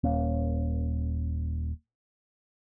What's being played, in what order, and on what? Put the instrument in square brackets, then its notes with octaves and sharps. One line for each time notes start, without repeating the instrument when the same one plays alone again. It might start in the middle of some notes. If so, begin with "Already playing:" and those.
[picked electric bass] D#1 A#3 C#4